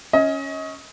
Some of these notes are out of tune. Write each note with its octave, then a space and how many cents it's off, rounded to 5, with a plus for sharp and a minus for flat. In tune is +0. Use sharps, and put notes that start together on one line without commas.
C#4 +0 D#5 +30